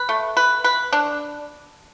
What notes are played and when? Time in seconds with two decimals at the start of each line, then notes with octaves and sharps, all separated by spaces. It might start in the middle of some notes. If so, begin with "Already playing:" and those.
Already playing: B4
0.09 A3
0.37 B4
0.64 B4
0.93 D4